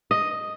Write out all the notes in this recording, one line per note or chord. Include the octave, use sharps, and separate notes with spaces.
D#5